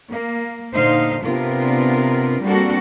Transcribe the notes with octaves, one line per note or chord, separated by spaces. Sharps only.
A#3
A#2 D3 D#4 C5 F5
C3 B3 D4 F4 A#4
G3 A#3 C4 D4 F#4 A4